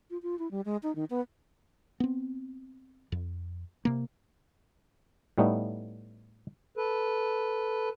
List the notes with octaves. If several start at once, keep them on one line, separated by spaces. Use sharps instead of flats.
F4
F4
E4
G3
G#3
D#4
D#3
B3
B3 C4
F2
C3 A#3
A2 G3 A3 B3 D#4
A4 B4